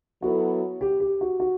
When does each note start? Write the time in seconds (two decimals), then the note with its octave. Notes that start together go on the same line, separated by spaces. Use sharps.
0.22 F#3 B3 E4 F#4 A4
0.81 G4
1.00 G4
1.21 F#4
1.40 F#4